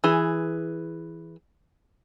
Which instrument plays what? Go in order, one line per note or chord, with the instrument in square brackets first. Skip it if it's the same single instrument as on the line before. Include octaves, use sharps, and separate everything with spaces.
[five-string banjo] E3 G#4